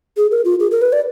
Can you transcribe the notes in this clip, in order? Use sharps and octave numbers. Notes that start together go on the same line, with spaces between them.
G#4
A#4
F4
G#4
A#4
B4
D5